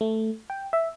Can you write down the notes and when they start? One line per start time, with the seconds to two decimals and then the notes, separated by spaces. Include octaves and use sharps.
0.01 A3
0.50 G5
0.73 E5